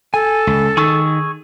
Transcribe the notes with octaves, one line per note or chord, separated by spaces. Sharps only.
A4 G#5
C#2
D#3 G#4 C#6 E6